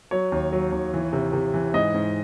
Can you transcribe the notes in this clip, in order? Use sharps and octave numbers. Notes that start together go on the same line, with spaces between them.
F#3 C#5
D#2
F#3
D#2
E3
C3
C3
E3
G#2 D#5
G#2